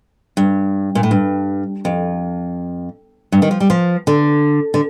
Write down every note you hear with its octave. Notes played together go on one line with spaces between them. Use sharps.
G2
A#2
A2
G2
F2
G2
D#3
F3
G3
F3
D3
D3